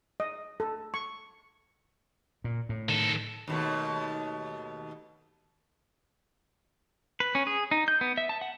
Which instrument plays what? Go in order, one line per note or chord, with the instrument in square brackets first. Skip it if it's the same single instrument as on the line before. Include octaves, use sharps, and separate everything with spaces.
[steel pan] D#5
A4
C#6
[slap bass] A#2
A2
[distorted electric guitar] D#3 A4
[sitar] D#2 B2 A3
[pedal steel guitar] B4
C#4
G#4
D#4
G6
B3
E5
A5
F#5